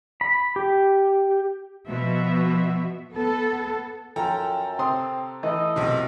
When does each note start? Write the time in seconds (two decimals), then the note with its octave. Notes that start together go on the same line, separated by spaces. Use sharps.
0.21 B5
0.56 G4
1.88 B2 F3 B3 F#4 E5
3.14 B3 A4
4.16 F#2 F3 A4 G5 A#5
4.79 C3 C4 C6 D#6
5.43 E3 A3 D#5
5.76 B1 C3